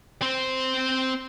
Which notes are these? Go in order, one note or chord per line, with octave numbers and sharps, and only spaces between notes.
C4 C5